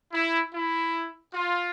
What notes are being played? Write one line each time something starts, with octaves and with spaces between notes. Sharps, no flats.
E4
E4
F4